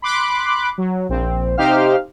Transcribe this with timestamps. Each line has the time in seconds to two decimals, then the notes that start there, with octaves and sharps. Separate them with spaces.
0.02 B5 C6 D6 F#6
0.78 F#3
1.09 A#1 C4
1.57 C3 D#4 G4 C5 F5 F6